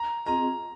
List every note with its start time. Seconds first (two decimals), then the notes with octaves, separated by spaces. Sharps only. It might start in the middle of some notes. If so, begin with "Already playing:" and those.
Already playing: A#5
0.26 C4 F4 G#4 D#5 A#5